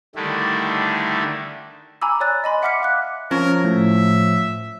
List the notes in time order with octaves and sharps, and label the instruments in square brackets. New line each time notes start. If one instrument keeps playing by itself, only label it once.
[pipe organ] D3 D#3 G3 A3 D4 E4
[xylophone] G#5 A#5 B5 D6 E6
C#5 D5 G#5 F#6 A6
D#5 G#5 B5 C6
E5 F#5 D6 F6 B6 C#7
F5 D6 F#6
[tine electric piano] F3 F4 C#5 [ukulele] C#4 [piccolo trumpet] A#4
[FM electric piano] A2 [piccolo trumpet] E5